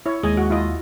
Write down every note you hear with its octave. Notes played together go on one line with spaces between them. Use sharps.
E4 C#5
D#2 G#3 D#5 G#5
F#4
E4 F4 D#5